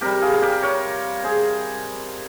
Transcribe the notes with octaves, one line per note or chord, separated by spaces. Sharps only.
C3 G3 G4 A#4
F4 G#4
G4 A#4
A#4 C#5
G#4 C5